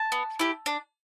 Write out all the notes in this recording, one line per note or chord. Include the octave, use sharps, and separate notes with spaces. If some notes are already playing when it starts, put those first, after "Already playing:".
Already playing: A5
B3
E4 G4
D4